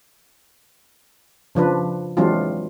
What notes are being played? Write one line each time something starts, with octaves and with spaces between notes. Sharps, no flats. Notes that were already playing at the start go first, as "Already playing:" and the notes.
C#3 F3 D4 B4
E3 F#3 G#3 C4 D4 F4